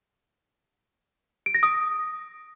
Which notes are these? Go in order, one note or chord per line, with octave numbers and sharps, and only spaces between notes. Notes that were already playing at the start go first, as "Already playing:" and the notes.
D7
A#6
D#6